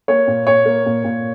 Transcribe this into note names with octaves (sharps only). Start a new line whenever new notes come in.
A#3 C#5
A#2
A#2 C#5
A#3
A#2
A#2